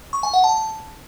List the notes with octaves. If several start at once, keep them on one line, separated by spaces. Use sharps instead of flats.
C#6
G#5
F#5
A5